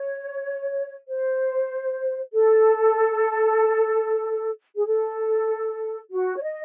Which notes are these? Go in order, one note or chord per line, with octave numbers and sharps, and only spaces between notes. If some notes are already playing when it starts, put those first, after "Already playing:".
Already playing: C#5
C5
A4
G#4
A4
F#4
C#5
D#5